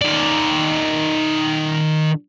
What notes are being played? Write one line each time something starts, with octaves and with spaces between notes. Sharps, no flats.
D#3 D5